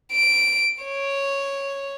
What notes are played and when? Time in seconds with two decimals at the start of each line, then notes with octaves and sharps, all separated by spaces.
0.12 D7
0.84 C#5